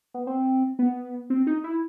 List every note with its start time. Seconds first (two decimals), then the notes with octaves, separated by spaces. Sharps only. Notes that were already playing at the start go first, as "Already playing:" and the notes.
0.14 B3
0.27 C4
0.79 B3
1.30 C4
1.47 D#4
1.64 E4